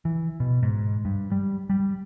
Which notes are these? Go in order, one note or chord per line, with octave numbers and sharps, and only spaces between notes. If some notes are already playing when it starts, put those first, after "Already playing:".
E3
B2
G#2
G2
G3
G3